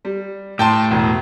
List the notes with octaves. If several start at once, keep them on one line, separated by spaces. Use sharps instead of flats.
G3
A2 G5 A5 C6
E1